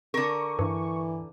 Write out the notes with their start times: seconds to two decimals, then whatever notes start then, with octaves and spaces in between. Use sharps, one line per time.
0.14 D3 A#4 C#6
0.59 G2 E3